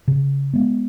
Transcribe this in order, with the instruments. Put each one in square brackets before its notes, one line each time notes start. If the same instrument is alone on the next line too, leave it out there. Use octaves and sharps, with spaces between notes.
[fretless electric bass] C#3
G#3 B3